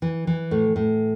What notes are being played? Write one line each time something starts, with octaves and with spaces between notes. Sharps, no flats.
E3
E3
A2
A2